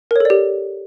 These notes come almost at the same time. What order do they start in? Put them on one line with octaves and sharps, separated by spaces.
A#4 C#5 A4 D5 G4